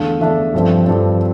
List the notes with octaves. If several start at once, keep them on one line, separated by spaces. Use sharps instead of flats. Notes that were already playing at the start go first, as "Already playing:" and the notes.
Already playing: E2 D3 A3 D4 F5
E2 D3 A3 D4 E5
G2 F3 C4 A4
G2 F3 C4 A4